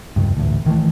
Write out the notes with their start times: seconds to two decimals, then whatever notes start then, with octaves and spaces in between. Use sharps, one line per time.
0.16 F1 C#2 G2
0.37 A1 D2
0.66 D#3 E3 F#3 A3